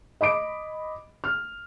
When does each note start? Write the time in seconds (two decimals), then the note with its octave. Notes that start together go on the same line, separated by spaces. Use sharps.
0.21 D#5 B5 D6 D7
1.24 F6